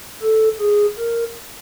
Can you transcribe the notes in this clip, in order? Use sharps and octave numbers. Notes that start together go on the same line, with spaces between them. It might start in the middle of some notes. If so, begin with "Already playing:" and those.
A4
G#4
A#4